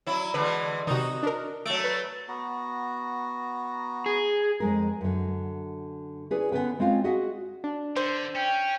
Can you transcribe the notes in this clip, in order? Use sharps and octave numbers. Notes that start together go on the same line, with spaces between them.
F#3 E4
D3 E3 G#3 B4
C3 D#3 D#4 F#4
D4 A#4
F#3 A3 D7
B4
B3 F#4 A#5
G#4
F2 G#3 A#4
F#2 D3
C#4 E4 G#4 B4 D5
D3 B3 C#4 D4 B4 G5
G#3 C4 C#4 F4 F5
F#4 G#4 D#5 E5 F#5
D4
D3 C5
C#4 G5